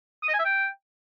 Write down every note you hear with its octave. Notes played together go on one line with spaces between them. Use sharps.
D#6
D#5
G#5
E5
G5